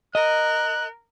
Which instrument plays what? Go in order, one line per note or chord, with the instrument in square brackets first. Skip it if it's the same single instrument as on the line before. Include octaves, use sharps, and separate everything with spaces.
[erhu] A#4 [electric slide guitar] D#5 [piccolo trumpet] F#6